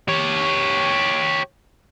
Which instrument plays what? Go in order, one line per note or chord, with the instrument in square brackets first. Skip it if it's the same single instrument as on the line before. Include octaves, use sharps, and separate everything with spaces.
[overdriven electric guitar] G4 C#5